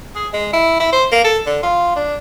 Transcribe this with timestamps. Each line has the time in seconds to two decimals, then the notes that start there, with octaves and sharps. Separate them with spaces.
0.15 G#4
0.33 G#3
0.53 E4
0.80 E4
0.92 C5
1.12 A#3
1.24 A4
1.46 D3
1.63 F4
1.96 D4